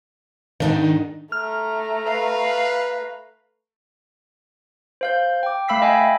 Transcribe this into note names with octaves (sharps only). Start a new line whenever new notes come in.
G#2 D#3 D4 D#4
A3 A#5 F6
B4 F5
C5 F5 G6
G5 D6
A3 F5 B5 E6 B6 C7
D#5 E5 G5 G#5 B5